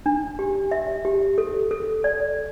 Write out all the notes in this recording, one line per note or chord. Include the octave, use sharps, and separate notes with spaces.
D4
G4
E5
G4
A4
A4
D5